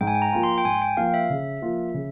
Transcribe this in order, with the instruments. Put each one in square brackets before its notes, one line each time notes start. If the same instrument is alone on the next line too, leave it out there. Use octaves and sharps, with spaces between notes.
[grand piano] G#2 [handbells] G5
[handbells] G#5
G5
A#5
[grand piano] F3 A#3 F4
[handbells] C6
G5
[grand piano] G#2 [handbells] G#5
[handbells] G5
[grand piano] F3 A#3 F4 [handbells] F5
[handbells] E5
[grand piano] C#3
F3 A#3 F4
C#3